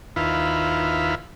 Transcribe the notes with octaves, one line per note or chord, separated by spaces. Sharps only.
D#2 E4 F4 B4